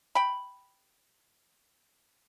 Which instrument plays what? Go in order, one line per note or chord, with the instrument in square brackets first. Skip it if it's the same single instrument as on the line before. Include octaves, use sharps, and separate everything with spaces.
[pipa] G5 B5